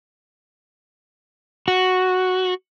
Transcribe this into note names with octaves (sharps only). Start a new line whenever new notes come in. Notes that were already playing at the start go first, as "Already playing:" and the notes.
F#4